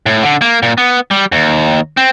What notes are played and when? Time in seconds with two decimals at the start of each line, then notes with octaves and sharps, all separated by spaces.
0.06 A2
0.23 D3
0.42 A#3
0.63 A#2
0.78 B3
1.11 G3
1.32 D#2
1.97 C4